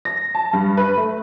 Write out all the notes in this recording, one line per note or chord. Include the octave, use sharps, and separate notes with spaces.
A#6
A5
G2
B4
A3